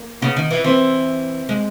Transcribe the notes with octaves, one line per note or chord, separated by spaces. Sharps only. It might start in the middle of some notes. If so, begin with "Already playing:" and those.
Already playing: A#3
C#3 B3
D#3
E3
E3 C4
G#3